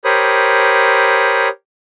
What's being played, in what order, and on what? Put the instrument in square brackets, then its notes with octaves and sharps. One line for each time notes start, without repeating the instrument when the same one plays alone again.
[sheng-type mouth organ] G4 A#4 C5 C#5 B5 D#6